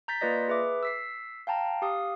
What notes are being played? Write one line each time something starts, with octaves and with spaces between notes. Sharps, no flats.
A#5 G6 A6 B6
A#3 F4 B4 D5 D#5 A#6
G#4 B4 E5 D6
E6 B6 C7
F5 G5 A5 A#5
G4 F5 D#6